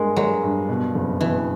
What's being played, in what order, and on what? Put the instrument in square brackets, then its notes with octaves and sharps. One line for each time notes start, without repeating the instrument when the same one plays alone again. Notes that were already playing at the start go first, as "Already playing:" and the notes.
Already playing: [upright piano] G2 G#3 [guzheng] A#3
[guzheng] F#3 [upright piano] G#3
[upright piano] G2
B2
F#1
[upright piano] B2 [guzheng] E3